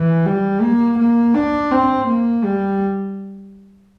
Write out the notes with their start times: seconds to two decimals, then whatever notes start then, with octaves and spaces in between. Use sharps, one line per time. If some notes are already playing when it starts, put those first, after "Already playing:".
Already playing: E3
0.25 G3
0.61 A#3
0.99 A#3
1.35 D4
1.71 C4
2.08 A#3
2.44 G3